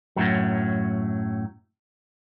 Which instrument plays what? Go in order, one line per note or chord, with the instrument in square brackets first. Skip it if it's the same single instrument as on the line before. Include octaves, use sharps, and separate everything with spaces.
[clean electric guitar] F#2 A2 F#3